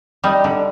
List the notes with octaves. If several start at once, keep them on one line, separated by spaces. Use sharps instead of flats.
G3 D#4
D3